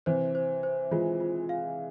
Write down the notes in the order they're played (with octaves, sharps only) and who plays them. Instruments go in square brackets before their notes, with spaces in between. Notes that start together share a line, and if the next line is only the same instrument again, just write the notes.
[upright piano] C3 E3 [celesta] C5
[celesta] C5
C5
[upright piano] E3 G#3 [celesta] F4
[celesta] F4
F5